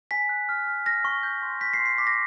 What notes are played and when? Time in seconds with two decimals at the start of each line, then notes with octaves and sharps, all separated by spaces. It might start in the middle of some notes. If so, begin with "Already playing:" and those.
0.11 G#5 B6
0.29 F#6
0.49 F6
0.67 F6
0.86 F6 A#6
1.05 C#6
1.23 G6
1.42 C6
1.61 G6 B6
1.73 C7
1.79 C6
1.86 C7
1.98 D6 B6
2.07 A#6